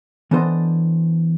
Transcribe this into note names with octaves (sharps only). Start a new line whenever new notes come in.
E3 B3 D4 A4 C5 D#5